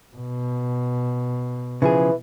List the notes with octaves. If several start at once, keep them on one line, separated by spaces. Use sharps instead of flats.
B2
C#3 E3 F3 G#4